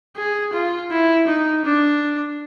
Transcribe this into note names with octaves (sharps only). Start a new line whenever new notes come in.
G#4
F4
E4
D#4
D4